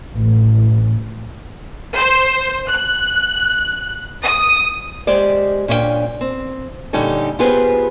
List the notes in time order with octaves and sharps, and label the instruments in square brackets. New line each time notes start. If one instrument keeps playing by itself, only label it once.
[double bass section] A1
[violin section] C5
F#6
D#6
[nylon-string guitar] G#3 G4 C5 D5
A#2 C#4 D4 C#5 G5
C4
A#2 D3 G3 C#4 D#4 A4
B3 F4 G4 G#4 B4 C5